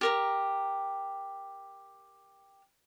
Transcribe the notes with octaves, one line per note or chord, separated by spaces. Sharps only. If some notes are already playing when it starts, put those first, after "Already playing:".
G4 A#4 A#5